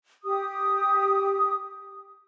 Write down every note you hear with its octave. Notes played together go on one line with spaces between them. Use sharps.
G4 D#6